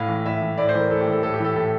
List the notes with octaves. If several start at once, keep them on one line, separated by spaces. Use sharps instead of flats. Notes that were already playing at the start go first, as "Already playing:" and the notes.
Already playing: A2 F5
E3
A2 E5
E3
A2 D5
C5
E3 A#4
A2 A4
G4
E3 A4
A2 A4
G4
E3 A4
A2 A4